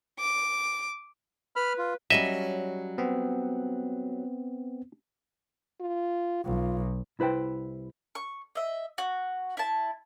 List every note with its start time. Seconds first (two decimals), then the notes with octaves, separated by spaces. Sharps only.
0.19 D6
1.56 B4 B5 F6
1.78 F4
2.10 F#3 G3 C#4 D#5 E5
2.98 B3 C4
5.81 F4
6.45 B1 F4
7.19 C2 E4 B4 C5 G5
8.15 C#6
8.55 D#5 E5
8.98 F#4
9.57 E4 A5